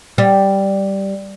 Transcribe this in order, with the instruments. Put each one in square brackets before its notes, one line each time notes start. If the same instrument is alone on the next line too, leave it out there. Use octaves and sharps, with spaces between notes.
[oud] G3